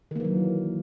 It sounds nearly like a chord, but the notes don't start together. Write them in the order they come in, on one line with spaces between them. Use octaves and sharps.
D#3 A#3 E3 F#3